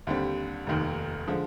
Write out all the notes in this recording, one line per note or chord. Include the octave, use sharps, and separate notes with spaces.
D#2 D3 G3 C4
F1 D#2 D#3
D3 F3 G#3